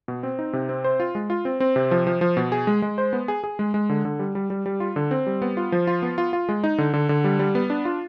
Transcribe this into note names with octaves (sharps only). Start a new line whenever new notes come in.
B2
C4
D#4
C3
C4
C5
F4
G#3
F4
C4
C4
C3
F3
F3
F3
B2
G#4
G#3
G#3
C5
B3
G#4
G#4
G#3
G#3
D3
D3
G3
G3
G3
G3
F4
D3
C4
G3
B3
F4
F3
F4
B3
F4
F4
G#3
D#4
D3
D3
D3
G3
G3
B3
D4
F4